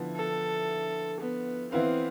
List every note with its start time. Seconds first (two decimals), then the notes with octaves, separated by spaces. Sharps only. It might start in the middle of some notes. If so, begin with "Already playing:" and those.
Already playing: D3 F3 B3 E4
0.16 A4
1.20 B3
1.72 E3 B3 C4 E4 B4 F5